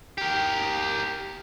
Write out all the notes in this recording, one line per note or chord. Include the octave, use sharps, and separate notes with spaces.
G4 A#4